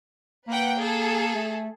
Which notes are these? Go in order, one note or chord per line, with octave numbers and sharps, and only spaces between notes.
A#3 B4 F#5 G5
G#4 A4
A3